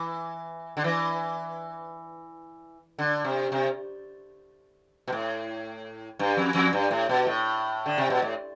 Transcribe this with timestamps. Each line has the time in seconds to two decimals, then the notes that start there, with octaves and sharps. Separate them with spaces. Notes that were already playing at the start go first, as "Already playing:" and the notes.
Already playing: E3
0.77 D3
0.84 E3
2.99 D3
3.24 C3
3.52 C3
5.08 B2
5.12 A2
6.19 G2
6.37 F2
6.55 F2
6.73 G2
6.91 A2
7.09 B2
7.27 A2
7.86 D3
7.98 C3
8.10 B2
8.22 A2